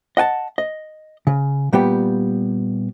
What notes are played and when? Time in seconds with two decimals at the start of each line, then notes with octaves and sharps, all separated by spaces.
0.17 D#5 F#5 G#5 A5
0.58 D#5
1.27 C#3
1.73 A#2 G3 B3 G4